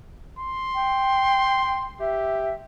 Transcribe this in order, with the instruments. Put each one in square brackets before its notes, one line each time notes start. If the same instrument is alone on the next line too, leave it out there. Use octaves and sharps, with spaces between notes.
[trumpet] C6
[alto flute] G5
[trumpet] G4 [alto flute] E5